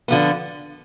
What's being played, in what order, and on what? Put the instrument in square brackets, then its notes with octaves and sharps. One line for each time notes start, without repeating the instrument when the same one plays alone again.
[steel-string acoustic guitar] D3 F3 B3